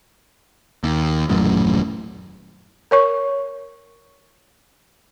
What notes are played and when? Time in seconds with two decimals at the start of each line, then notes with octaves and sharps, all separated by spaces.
0.83 D#2
1.29 D#1 A1 F#2 A2
2.91 A#4 C#5 C#6